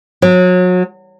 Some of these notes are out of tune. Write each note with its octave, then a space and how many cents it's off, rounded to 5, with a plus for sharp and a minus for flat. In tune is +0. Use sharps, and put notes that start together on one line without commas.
F#3 -30